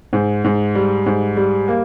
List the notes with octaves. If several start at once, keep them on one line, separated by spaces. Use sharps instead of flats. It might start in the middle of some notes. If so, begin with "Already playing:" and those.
G#2
G#2
G3
G#2
G3
A#3